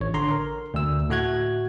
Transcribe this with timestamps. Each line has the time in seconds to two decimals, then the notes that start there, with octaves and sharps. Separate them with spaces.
0.01 A1 C#5
0.14 D3 A#5 C6
0.31 A#4
0.74 D2 E6
1.09 A2 A3 F#4 F#6 G#6